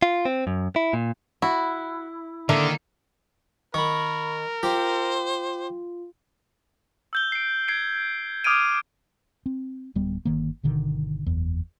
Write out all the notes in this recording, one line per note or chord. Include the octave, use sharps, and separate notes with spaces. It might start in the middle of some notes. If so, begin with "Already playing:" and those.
F4
C4
F#2
E4
A#2
E4 F#4
D3 D#3 A#3 E5
D#3 A#4 B5 C#6
F4 G4 C5
E6 G6 G7
C7 D7
G#6 C7 D7
D6 D#6 F6 G#6 D7 D#7
C4
D1 G3 B3
G1 D#3 A#3
G1 B2 D3 D#3
F#1 E2